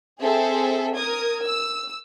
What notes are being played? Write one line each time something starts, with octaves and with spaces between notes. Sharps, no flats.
C4 G#4 A4 E5
A#4 D#6 G#6
E6